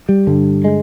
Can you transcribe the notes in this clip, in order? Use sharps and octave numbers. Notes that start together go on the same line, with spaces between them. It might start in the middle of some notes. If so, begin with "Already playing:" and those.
G3
G2 D3
G#3